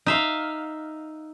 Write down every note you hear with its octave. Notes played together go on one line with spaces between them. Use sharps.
D#4 E5 F5